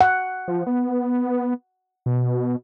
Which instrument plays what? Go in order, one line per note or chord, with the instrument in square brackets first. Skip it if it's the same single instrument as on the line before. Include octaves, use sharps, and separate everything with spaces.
[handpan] F#5
[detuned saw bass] F3
B3
B2